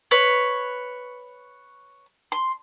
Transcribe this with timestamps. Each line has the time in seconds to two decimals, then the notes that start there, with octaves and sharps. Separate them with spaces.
0.11 B4 C#5
2.32 C6